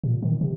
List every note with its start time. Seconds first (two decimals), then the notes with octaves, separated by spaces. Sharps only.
0.04 A#2
0.22 D#3
0.41 C3